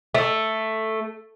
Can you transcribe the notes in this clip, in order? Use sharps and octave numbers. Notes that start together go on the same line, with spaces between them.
A3